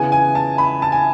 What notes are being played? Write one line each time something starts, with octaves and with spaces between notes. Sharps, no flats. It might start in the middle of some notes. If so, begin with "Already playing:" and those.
Already playing: C#3 E3 B3 G#5
G#5
A5
B5
A5
G#5